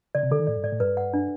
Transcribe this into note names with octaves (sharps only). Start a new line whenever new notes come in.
C#3 D5
C3
D3 A4
D#3
A2 D5
G2
G#2 D5
A2
G2 B4
F#5
D4